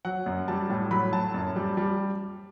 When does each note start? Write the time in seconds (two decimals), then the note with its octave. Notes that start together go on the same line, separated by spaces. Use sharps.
0.05 F#3 F#5
0.26 F#2
0.48 G3 A5
0.70 A2
0.91 F#3 B5
1.13 A2 A5
1.34 F#2
1.56 G3
1.77 G3